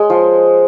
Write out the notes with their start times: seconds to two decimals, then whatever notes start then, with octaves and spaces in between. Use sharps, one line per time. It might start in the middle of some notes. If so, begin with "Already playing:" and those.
Already playing: G#3
0.10 F3